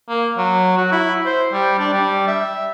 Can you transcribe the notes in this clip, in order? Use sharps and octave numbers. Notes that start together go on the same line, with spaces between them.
A#3
F#3
F#4
E4
C5
G3
D4
G3
E5